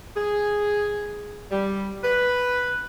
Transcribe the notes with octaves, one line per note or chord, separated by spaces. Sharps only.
G#4
G3
B4